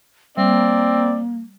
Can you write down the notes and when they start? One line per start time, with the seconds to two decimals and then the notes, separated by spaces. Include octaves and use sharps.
0.37 G3 A#3 C4 D5